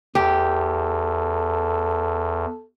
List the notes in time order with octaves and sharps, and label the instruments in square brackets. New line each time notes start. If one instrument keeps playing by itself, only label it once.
[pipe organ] E2 [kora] G4 [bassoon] A4